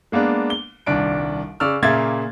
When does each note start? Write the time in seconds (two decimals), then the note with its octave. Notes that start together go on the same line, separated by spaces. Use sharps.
0.12 G#3 A#3 B3 D4
0.50 G7
0.86 D#1 C2 D4 D7
1.60 C#3 D5 C#6 E6 F6
1.82 A#2 C#3 A#3 E5 G#6 A6